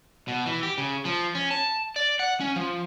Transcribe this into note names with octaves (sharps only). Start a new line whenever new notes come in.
B2
E3
G4
C#3
F3
C#4
A5
D5
F#5
C#4
F3